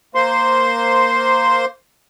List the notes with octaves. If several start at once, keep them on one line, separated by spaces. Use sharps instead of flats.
A#3 C5 C6